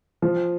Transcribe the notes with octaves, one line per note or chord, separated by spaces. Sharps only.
F3